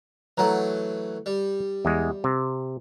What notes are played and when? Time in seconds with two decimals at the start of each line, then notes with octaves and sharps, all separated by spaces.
0.38 E3 F#3 A3 F#5 A#5
1.26 G3
1.85 E2 G#3
2.24 C3